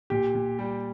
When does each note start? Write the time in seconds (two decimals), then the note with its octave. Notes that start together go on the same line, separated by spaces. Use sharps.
0.10 A#2 G4
0.35 A#2
0.59 G3